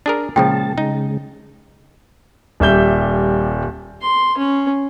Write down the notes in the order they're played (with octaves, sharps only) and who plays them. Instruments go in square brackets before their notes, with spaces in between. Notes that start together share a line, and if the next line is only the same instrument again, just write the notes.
[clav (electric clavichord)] D4 G#4 A#4
[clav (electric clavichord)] A#2 C#3 F3 [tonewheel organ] G#3 A5 [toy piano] G5
[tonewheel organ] C#3 G#3 [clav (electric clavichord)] D#4
[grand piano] D#1 G3 E5 G6 G7
[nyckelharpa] C6
C#4